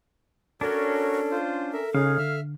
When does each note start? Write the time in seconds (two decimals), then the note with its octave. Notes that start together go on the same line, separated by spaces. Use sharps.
0.61 C#4 D4 F#4 A4 A#4 C#5
1.31 F4 C5
1.73 A4 A#4 E5
1.94 C#3 C#4 D#4 G#4 F5
2.18 D3 E5 F6